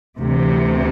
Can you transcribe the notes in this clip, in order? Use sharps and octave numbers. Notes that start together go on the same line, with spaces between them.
D2 C3 E3